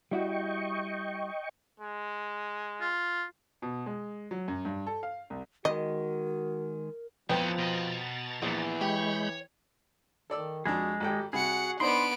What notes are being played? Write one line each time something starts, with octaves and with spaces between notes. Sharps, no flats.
G3 E4 F#4 D#5 G5 C#6
G#3
F4
B2
G#3
F#3
F#2
G2
A4
F5
C2
D#3 G#3 F#4 A#4 D#5
F2 E3 F3 B3 C#4 G5 A#5 A6
B2 D#5
A#1 E2 E3
G#3 G4 C#5 B5 G6
D#3 A4 D5 E6
F2 G#3 D4 F#4 G#4
G#1 G4 A4 G5
C3 G3 F#4 G#4 F#5 C#7
B3 D4 D#4 C5 D5 B5 C6 D7